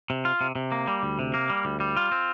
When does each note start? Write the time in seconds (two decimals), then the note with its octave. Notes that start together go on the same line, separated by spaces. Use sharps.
0.10 C3
0.25 F4
0.41 C3
0.55 C3
0.72 A#3
0.87 G3
1.03 D2
1.19 C3
1.34 A#3
1.50 G3
1.65 D2
1.80 G3
1.97 F4
2.12 C4